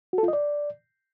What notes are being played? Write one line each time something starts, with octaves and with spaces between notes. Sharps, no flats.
F#4
A4
F4
D#5
D5